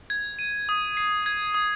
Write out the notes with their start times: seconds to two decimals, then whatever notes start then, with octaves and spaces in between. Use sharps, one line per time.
0.10 G#6
0.39 D#7
0.69 D#6
0.97 C7
1.26 G#6
1.54 D#6